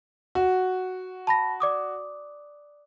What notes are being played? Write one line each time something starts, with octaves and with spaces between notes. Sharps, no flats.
F#4
A5 B5 A#6
D5 D6 D#6